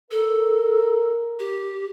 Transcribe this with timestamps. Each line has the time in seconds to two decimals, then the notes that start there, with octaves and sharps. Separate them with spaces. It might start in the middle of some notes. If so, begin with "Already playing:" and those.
0.11 A4 A#4
1.39 G4